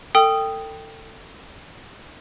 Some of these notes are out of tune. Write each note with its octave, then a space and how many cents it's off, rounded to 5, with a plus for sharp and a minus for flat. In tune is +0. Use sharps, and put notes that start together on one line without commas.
A4 +30 G5 +0 D#6 +0